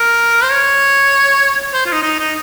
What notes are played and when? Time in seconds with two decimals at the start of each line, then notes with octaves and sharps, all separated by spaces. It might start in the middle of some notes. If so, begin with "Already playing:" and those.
Already playing: A#4
0.43 C5
0.51 C#5
1.73 C5
1.86 F4
1.93 D#4
2.03 D#4
2.19 D#4